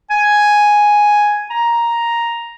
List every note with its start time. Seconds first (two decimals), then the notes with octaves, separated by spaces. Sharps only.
0.10 G#5
1.50 A#5